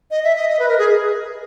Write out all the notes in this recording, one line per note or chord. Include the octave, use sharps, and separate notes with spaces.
D#5
E5
D#5
D#5
B4
A#4
G#4